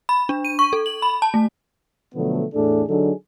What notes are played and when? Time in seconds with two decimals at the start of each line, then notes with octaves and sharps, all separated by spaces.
0.09 B5
0.29 D4
0.45 D#7
0.59 C#6
0.73 A4
0.86 F#7
1.02 B5
1.22 A5
1.34 A3
2.15 B2 D3 F3 F#3 A3 B3
2.54 E2 A2 A3 D4 G#4 A4
2.89 D3 F#3 D4 D#4 G#4 A4